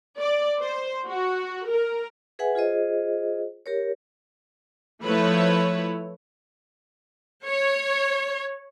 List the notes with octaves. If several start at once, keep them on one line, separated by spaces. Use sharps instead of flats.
D5
C5
F#4
A#4
G#4 B4 E5 F#5 G#5
F4 G#4 C5 D#5
G4 A#4 C#5
F3 A3 E4 B4 C#5
C#5